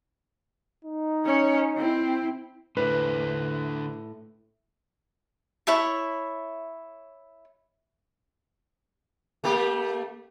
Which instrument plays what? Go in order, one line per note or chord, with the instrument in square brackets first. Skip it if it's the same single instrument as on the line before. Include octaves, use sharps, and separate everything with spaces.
[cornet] D#4
[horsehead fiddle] C#4 C#5
C4 E4
[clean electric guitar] A2 [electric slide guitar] D3 D4 C5 [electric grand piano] B4
[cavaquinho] E4 C#5 E5 A5
[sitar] A3 A#3 G4